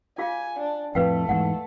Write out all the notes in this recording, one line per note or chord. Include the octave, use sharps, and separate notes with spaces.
F4 G#4 F5 G#5
D4
F2 A2 A3 B4 F5 G5
E2 G#2 F#5